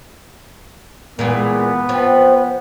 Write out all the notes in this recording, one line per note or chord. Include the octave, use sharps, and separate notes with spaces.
A#2 E3 G#3 B3
F3 C4